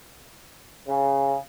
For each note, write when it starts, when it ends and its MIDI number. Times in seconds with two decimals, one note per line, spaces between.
0.87 1.36 49